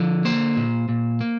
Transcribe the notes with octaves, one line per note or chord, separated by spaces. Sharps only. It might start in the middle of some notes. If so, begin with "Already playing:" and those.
Already playing: D3 F3
A#3 C5
A#2
A#2
A#3